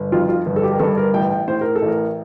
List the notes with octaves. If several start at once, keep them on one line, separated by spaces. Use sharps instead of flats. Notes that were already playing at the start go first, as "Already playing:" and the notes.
Already playing: G1
F2 F4
F4
G1
A4
G4
A#4
G2 A4
A#4
A1 G5
G5
A2 C5
A#4
A4
A1
A#4